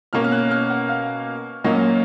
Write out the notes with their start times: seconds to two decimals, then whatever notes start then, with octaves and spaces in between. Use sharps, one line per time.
0.13 B2 A#3 C#4 F6
0.24 F6
0.32 F#6
0.51 F6
0.70 F#5
0.89 F5
1.64 A#2 F#3 A#3 C#4 D#5